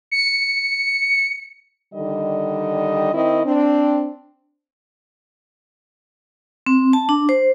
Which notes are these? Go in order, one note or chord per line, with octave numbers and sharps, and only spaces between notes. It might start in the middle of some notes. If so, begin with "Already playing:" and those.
C#7
D3 D#3 G3 D#5
D#3 C4 E4 D#5
C4 D4
C4
A5
D4
C5